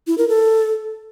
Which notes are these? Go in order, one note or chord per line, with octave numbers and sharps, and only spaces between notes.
E4
A#4
A4